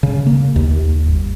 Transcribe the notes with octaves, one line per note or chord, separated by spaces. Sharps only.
C#3
A#3
D#2
G1